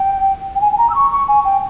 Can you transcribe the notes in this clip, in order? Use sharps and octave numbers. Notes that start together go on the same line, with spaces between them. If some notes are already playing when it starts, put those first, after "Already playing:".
Already playing: G5
G5
G#5
G#5
A#5
E6
C#6
C#6
G#5
G5